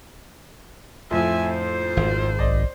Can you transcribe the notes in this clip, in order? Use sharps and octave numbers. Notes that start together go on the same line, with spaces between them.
F2 A2 F3 E5 G#5
C5
G#1
B1 D5 D#5